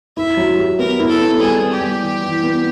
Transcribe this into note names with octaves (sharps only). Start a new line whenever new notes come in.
E4 E5
F#3
G4
B3 A#4
E4
A4
B3
G3 G#4
B3
G4
G3
E3
E3
B3